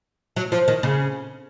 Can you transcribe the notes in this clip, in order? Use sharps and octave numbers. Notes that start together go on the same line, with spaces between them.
F#3
F3
D#3
C#3